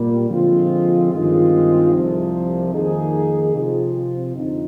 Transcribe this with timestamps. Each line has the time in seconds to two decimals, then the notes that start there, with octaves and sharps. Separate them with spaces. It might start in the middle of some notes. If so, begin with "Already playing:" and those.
Already playing: A#2 G3 A#3
0.30 D3 F3 G#3 C4 F4
1.11 G2 D#3 G#3 C4 F4
1.93 C2 C3 F3
2.73 F2 D#3 A#3 D#4 G#4
3.54 C3 F3 C4 F4
4.35 F2 D3 F3 C4 D#4